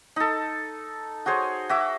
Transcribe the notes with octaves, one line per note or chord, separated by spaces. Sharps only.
D#4 A4
F#4 G#4 C5 C#5
F#4 E5 D6